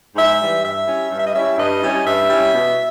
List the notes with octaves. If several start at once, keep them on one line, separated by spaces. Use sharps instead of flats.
G#2 E5
E3 G3
G2 E5
G3 C#4 E4
G2
E5
D#5
G3 C#4 E4 E5
G2 D#5
G3 C#4 E4
G2 E5
G3 C#4 E4
B2